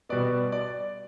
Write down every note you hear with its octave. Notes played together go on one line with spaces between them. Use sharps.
B2 G3 B3 D5
D5